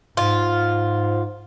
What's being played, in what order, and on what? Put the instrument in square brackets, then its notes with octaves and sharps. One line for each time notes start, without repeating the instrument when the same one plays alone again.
[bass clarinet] G#2 [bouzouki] F4